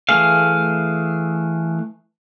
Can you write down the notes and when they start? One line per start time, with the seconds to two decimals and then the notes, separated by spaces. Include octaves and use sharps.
0.09 E3 A3 G#4 F5